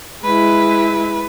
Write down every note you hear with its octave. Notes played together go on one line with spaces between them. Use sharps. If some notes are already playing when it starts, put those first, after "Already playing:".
G#3 E4 B4